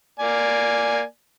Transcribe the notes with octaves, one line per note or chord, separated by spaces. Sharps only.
A#3 D5 G#5